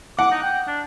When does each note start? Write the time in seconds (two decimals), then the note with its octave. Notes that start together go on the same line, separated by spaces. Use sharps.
0.19 F#5 D6
0.31 D#4
0.43 G5
0.67 D4